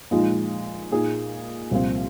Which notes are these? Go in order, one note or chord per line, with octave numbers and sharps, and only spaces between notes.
A#2 F3 G#3 D#4
A#2 A#3 D#4 G#4
C2 A#2 F3 C4 F4